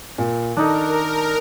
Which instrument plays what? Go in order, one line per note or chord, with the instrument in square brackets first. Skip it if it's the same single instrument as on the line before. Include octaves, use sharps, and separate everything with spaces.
[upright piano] A#2
[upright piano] D#3 [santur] D4 D#4 A4 [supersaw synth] A#4